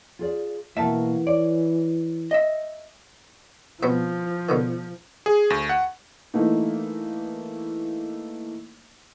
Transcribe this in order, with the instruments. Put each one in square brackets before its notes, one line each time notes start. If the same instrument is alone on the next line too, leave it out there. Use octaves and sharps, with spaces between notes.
[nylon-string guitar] F4 G#4 D5
[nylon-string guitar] B2 A#3 [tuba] E3 [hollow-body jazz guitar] E5 A5
[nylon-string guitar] C#5 [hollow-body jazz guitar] D5
[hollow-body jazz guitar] D#5 E5
[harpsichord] B2 B3 C4 [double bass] F3
[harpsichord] B2 D3 D#3
[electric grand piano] G#4
D2
F#5
[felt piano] E3 A3 A#3 D#4